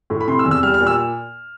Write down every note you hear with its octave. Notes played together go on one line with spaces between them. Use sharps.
A2
B5
C3 C6
E6
E2
E6
G3 F6
F6
A#2
E6